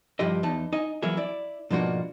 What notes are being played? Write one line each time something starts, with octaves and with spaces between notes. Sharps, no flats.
C#2 G2 F3 E4 G4 D#5
E2 D#4 A5
D#4 D#5 G#5
E3 F#3 A#3 E4 G#4
E4 D5
G#2 B2 F3 A#3 D4 F#4